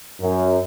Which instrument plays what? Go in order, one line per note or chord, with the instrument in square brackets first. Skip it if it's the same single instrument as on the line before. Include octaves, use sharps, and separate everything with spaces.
[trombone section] F#2